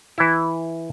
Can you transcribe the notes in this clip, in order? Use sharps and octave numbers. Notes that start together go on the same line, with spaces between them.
E3 E4